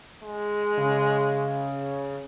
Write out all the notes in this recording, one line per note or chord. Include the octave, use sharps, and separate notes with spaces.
G#3
C#3